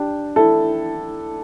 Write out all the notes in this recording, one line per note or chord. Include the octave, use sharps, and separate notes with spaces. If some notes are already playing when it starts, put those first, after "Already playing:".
Already playing: D4 G4
E4 A4